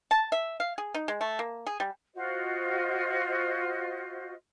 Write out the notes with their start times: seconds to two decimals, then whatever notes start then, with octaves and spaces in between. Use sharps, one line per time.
0.11 A5
0.32 E5
0.60 F5
0.78 G#4
0.94 D#4
1.08 G#3
1.21 A3
1.39 A#3
1.67 G#4
1.80 G3
2.14 F4 F#4 C5 D#5